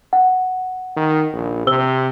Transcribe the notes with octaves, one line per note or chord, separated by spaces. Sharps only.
F#5
D#3
A#1
C3 C5 E6 G7